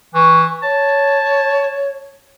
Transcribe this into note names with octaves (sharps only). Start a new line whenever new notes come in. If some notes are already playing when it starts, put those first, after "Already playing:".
E3 C#6
C#5 A5